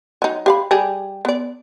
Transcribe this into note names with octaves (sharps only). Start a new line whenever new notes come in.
F#3 D#4
G4 F5 B5
G3 G4 G#4
B3 D5